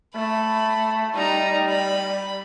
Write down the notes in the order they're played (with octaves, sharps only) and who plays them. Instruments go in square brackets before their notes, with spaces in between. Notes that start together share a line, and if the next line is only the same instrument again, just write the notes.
[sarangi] A3 [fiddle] B5
[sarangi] G3 [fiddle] D#4 A#5
[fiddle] B5